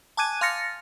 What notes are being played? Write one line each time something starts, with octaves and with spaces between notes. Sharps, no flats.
G#5 A5 D6 F#6 G#6 D#7
F5 C6 F6 A6 A#6 C#7